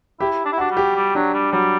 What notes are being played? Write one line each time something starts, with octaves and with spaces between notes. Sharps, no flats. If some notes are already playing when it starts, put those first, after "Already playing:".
E4 G4
D4
E4
D4 F#4
G3
G4
G3
F#3 D4
G3
F#3 G3